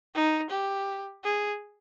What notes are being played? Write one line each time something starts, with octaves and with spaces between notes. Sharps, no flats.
D#4
G4
G#4